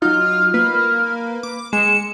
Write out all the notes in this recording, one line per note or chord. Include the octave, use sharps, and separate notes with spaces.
F#3 D#4 F4 F6
A#3 B4
D6
G#3 C#7 E7